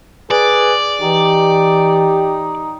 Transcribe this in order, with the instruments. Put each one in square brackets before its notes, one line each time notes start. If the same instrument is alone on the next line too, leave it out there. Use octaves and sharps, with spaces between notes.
[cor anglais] G#4 [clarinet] B4 [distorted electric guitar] D5
[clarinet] E3 [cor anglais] D#4 [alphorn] G4